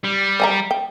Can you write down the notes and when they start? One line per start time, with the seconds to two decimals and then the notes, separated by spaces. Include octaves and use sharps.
0.05 G3
0.40 D5 G#5 A#5
0.71 G5